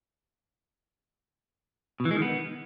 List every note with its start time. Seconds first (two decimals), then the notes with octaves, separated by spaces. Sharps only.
2.00 B2
2.05 E3
2.11 G#3
2.16 D#3
2.22 B3